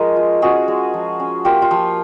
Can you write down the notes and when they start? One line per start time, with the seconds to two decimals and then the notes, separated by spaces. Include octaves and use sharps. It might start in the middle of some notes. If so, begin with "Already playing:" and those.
Already playing: F3 G#3 C#4 G#4 A#4 D#5
0.16 F4
0.42 C#4 F#4 G#4
0.68 G#3
0.94 F3
1.20 C#4
1.45 A#3 F4 G4
1.62 F4
1.71 F3